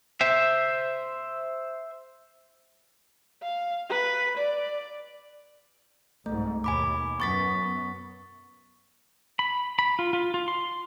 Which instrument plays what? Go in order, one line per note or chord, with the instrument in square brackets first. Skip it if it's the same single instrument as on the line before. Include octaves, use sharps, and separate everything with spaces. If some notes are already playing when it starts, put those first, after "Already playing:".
[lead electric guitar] C5 E5
[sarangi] F5
B4
D5
[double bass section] C2 G#2 [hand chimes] A3
[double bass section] D#2 B2 [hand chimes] G#5 B5 D6
[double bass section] F#2 B3 [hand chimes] C#6 A6 B6
[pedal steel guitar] B5
B5
F4
F4
F4
C6